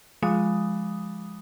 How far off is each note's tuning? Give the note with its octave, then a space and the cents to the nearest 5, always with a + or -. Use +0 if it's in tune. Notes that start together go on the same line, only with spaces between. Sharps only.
F3 +0 G#3 +0 D#6 +0